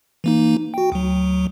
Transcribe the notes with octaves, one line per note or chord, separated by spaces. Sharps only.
E3 A#3 D#4
F#4 G5
D2 F#3